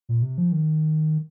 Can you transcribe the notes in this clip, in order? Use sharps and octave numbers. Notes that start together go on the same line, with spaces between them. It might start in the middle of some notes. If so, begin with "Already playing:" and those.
A#2
C3
F3
D#3